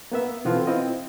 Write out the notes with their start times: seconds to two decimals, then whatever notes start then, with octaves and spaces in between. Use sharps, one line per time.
0.12 A#3 B3 E5
0.45 B2 E3 B3 C4 F4 A4
0.67 C4 E4 F4 D#5